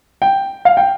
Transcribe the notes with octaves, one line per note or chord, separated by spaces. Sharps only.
G5
F5
G5